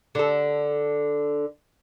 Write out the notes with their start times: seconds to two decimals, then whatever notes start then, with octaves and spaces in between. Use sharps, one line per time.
0.15 D3 A4